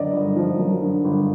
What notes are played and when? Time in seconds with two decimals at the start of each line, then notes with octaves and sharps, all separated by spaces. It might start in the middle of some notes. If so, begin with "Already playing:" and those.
Already playing: F#2 D3 D5 D#5
0.13 G1
0.36 F3
0.59 F#2
0.81 D3
1.05 G1